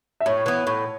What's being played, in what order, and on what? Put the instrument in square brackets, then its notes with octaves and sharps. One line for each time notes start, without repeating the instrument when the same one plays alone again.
[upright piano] E5
[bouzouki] A2 [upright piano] C#5
[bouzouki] E3 B3
A2